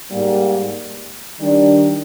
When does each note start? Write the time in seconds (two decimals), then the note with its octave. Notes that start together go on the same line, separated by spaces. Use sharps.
0.11 G#2 G3 A#3
1.39 D#3 G3 D4